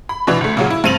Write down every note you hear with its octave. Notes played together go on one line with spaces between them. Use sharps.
B5
B2 E3 D4
D2 A3
A#2 C#3 F#3
E4
G2 C4 D#7 F7 F#7